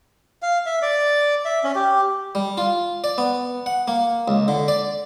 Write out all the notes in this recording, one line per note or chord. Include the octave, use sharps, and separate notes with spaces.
F5
E5
D5
E5
C#4
G4
G3
F4
D5
B3
F#5
A#3
C#2
D3
D5